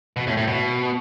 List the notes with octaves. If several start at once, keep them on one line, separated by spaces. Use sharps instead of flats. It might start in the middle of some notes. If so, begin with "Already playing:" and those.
B2
A2
A2
B2